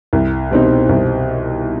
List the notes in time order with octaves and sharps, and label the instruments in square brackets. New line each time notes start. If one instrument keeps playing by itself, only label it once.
[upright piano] C2
B2 G3 C4 D#4
C2